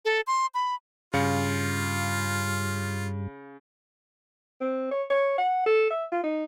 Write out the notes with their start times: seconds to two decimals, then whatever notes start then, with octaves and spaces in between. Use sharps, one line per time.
0.05 A4
0.27 C6
0.54 B5
1.14 G2 C#3 F4 F5 C#7
4.61 C4
4.91 C#5
5.10 C#5
5.38 F#5
5.66 A4
5.90 E5
6.12 F4
6.24 D#4